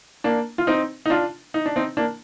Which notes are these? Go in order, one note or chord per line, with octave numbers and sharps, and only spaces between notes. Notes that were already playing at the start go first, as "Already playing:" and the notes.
A#3 D4
F4
C4 D#4
D#4
D4 F4
D#4
D4
C4 D#4
A#3 D4